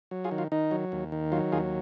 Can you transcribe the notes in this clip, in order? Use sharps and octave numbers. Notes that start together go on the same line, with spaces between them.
F#3
F4 G#4
D#3
F4
D#3 D#4
F#3
D#2
D#3
F#3 F4
D#2 F4 G#4